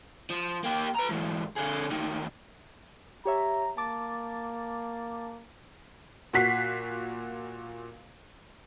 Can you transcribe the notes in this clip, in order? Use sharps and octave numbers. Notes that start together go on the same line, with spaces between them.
F3
A#3 G4
B4 A#5
G#2 E3
D3 G#4
D2 D#3
G4 C#5 E5 A#5
A#3 A5 D6 A6
A#2 F#4 B6 C7